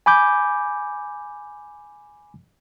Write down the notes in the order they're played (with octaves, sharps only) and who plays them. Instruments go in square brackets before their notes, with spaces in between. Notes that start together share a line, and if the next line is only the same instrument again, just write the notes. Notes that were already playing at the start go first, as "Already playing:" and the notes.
[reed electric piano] G#5 B5 D6 G6